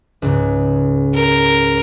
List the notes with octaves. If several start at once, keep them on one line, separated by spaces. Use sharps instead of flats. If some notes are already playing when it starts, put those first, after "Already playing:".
C#2 G#2
A#4